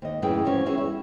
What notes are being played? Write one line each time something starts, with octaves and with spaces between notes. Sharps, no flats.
D#2 D#5
F#2 A2 C#3 E3 G#4 G5
E3 F3 C#4 F#4
B3 C#4 E4 F#4 G#4 C#5
G3 E4